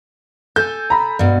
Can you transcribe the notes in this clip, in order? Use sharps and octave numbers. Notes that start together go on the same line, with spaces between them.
A4 G#5 G6
A#5 B5
G2 B2